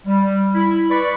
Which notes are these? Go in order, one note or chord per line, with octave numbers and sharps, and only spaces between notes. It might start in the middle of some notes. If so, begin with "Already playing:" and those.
G3
E4
B4 D5 B5 C#6